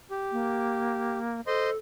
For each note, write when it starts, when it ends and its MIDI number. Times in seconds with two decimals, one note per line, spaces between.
0.11 1.18 67
0.32 1.41 58
1.47 1.77 69
1.47 1.70 72
1.47 1.70 75
1.47 1.70 84